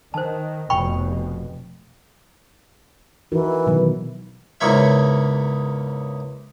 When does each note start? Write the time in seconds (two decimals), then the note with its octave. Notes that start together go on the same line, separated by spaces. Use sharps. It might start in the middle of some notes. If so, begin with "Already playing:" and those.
0.14 D#3 C5 A5
0.70 F1 B2 G5 B5 C#6
3.32 E3 D#4 F#4 A#4
3.67 B2 D#3 F#3
4.61 E2 G#2 C#3 A#3 C#5 E5